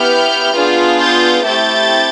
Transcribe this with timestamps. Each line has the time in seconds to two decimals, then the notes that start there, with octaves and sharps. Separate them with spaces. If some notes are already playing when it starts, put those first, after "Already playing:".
Already playing: B3 E4 G4 F6 G6
0.53 B3 D4 F4 G#4
0.99 G6 A6
1.45 A3 C4 E4 G4 G6 A6